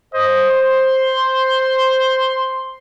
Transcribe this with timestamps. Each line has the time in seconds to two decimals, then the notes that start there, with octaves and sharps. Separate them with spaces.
0.14 C5 D#5
0.49 C6